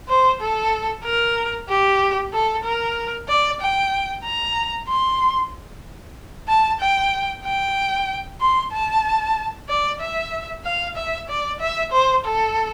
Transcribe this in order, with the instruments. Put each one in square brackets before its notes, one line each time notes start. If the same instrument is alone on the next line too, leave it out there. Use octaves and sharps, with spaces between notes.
[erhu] C5
A4
A#4
G4
A4
A#4
D5
G5
A#5
C6
A5
G5
G5
C6
A5
D5
E5
F5
E5
D5
E5
C5
A4